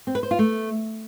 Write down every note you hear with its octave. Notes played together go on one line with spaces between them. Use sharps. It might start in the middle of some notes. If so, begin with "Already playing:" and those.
C4
B4
C5
F4
A3